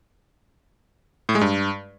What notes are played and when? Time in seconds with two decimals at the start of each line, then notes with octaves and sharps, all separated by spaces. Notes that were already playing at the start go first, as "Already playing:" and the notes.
1.29 A2
1.35 G#3
1.41 G2